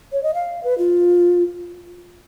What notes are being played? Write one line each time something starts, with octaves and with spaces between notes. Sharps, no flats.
C#5
D#5
F5
B4
F4